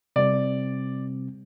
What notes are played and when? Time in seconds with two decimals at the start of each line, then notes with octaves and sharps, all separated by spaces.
0.16 C3 G3 C4 D5